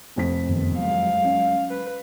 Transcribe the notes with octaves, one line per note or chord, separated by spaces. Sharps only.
F1 F2 B6
F#2 D#3 B3
F#3 G#3 F5
C#4
B4